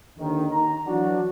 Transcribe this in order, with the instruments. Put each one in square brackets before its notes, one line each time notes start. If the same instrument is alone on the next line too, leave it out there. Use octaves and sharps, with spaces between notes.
[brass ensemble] D#2 D3 D#3
D#4 A#5
E3 F#3 D4 F#4